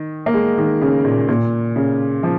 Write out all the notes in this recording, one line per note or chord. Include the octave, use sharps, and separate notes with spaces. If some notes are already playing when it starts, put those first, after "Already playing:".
Already playing: D#3
A#3
G#3
D#3
C#3
A#2
A#2
C#3
F3